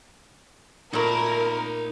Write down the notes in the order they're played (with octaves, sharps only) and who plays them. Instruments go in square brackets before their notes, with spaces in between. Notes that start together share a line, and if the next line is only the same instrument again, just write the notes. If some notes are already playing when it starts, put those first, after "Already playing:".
[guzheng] A#2 A3 [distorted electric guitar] D#4 B5 [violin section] A#4